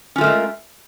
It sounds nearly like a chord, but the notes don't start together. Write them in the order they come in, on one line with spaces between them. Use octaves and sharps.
C#4 F4 A3 A#4 G#3